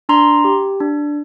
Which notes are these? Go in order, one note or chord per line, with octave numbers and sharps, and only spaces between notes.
D4 A#5 C6
G4
D4